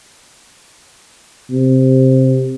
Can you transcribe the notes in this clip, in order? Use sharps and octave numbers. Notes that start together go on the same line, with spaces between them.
C3